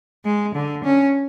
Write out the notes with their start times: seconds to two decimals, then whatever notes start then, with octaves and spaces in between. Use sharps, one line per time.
0.24 G#3
0.54 D3
0.84 C#4